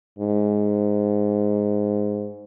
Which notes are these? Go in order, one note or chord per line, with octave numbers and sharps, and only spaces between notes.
G#2